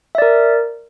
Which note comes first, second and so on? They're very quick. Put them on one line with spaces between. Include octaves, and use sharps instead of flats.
E5 D5 A#4